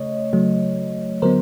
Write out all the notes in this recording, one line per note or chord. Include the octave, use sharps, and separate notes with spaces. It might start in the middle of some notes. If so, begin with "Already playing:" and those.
Already playing: C#3 A3 C#5 D#5
C#3 F#3 A3
D3 F#3 B3 A#4 C5